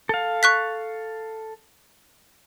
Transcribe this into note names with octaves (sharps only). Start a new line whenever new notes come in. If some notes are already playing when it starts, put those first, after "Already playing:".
A4 F5
C#6 F#6 B6